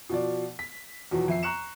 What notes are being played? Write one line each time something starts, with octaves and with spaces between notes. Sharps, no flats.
B2 F3 D5
B6
E2 B2 F3 F#3
F2 E5 C7
A#5 C#6 F#6 C#7 E7